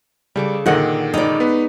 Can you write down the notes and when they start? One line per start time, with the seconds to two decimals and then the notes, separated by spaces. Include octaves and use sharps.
0.36 C#3 G3 A4 D6
0.66 A#2 D3 D#3 G#4 D#5 F#5
1.14 G#3 C#4 D#4 D5 B5
1.40 B3 B4